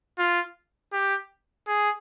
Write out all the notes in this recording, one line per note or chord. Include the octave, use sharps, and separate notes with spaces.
F4
G4
G#4